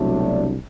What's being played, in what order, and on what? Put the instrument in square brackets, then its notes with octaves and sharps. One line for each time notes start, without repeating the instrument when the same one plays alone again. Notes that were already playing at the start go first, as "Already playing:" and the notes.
Already playing: [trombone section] C2 B2 F#3 A3 D4